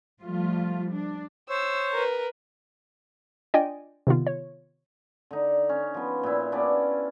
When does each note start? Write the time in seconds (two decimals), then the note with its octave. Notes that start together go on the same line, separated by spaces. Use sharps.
0.22 F3 G3 A3 F4
0.92 D4
1.49 C5 C#5 E6
1.92 A#4 B4
3.54 D4 F4 D5 D#5 G5 G#5
4.07 C3 D#3 B3 F4
4.27 C#5
5.31 D3 D#4
5.69 C#4
5.94 F3 B3
6.23 A#2 E4
6.52 B3 C#4 D4 G4